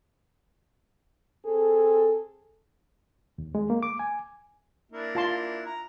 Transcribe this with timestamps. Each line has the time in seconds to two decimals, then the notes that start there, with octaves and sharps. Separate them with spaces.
1.46 C4 G#4 A4
3.38 D#2
3.55 G#3
3.70 A#3
3.83 D6
3.99 G#5
4.92 A#3 D4 E4
5.15 F4 A5 C6
5.66 A#5